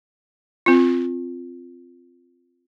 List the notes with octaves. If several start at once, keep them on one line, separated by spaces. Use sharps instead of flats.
C4 F4